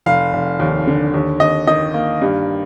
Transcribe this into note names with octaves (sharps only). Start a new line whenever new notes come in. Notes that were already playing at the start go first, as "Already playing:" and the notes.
F1 F5
F1
D#2
D3
D#2
D#2 D#5
D#3 D#5
A#3
G2